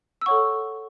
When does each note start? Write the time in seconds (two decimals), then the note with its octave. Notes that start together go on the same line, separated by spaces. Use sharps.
0.21 E6
0.26 A4 C#5 F#5 C#6